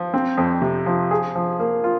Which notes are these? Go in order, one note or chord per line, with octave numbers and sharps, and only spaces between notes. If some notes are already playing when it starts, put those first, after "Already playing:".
Already playing: F3
C4
F2
C3
F3
G#4
F3
A#3
F4